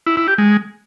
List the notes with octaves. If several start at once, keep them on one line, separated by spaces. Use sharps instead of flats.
E4
E4
G4
G#3